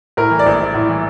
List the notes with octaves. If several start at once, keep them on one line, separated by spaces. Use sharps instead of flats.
A2 A#4
E3
D5
A#1
A#1
A2
E3